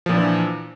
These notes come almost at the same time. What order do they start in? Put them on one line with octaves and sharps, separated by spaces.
F3 A#2 D4 E3